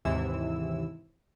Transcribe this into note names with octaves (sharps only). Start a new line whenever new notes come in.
D#2 G#2 C3 E3 E4 E6